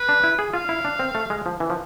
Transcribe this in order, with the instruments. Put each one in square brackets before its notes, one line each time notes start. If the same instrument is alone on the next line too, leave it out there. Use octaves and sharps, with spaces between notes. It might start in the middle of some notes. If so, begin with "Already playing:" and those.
Already playing: [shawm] B4
[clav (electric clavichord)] D4
E4
G#4
[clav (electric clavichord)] F4 [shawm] F5
[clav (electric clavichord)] E4
D4
C4
A3
G#3
F3
E3
F3